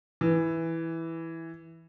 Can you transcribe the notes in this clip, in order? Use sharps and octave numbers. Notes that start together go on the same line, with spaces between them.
E3